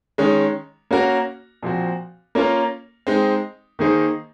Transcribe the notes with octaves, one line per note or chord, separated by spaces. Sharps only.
D#3 G#3 C#4
A#3 C#4 F#4 A#4
A#2 F3 C4 F#4
A#3 C#4 F4 A#4
G#3 C4 D#4
D#3 A#3 D#4 G#4 C5